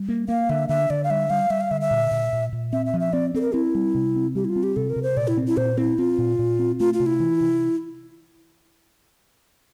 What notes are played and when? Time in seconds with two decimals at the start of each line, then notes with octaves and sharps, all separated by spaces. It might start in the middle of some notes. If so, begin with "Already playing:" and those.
Already playing: G3
0.09 A#3
0.28 A#3 F5
0.49 D3 E5
0.69 D3 E5
0.90 D3 D5
1.04 F5
1.10 G3 E5
1.30 G3 F5
1.50 G3 E5
1.61 F5
1.71 D3 E5
1.81 E5
1.91 A#2
2.11 A#2
2.33 A#2
2.53 A#2
2.73 C4 E5
2.86 E5
2.94 F3
3.00 E5
3.13 C4 D5
3.34 C4 A4
3.41 A#4
3.54 C4 E4
3.75 G3
3.95 C3
4.16 C4
4.35 G3 G4
4.45 E4
4.49 F4
4.56 C4
4.63 G4
4.76 C3 A4
4.90 A#4
4.96 C3
5.03 C5
5.17 A#2 D5
5.28 E4
5.37 C4
5.47 E4
5.57 A#2 C5
5.77 C4 E4
5.98 C4 F4
6.18 A#2
6.39 A#2
6.59 C4
6.79 A3 F4
6.94 F4
7.00 C3
7.06 E4
7.20 E3
7.41 C3